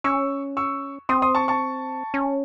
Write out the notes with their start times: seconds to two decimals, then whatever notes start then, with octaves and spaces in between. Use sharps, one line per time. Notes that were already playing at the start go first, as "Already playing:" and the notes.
0.04 C#4 C#6 E6
0.57 C#6 E6
1.09 C4 C6 D#6
1.22 C6 D#6
1.35 A5 C#6
1.48 A5 C#6
2.14 C#4